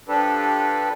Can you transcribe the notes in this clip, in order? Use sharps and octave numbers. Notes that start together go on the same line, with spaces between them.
F3 D4 G4 A4 B4